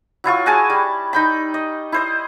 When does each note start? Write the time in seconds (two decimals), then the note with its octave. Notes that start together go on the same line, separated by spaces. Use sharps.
0.24 F#3 E4 F4 C#6
0.46 F#4 G#4 G#5 A5
0.70 G3
1.13 D#4 G5 B5
1.54 D#5
1.92 E4 C5 D#5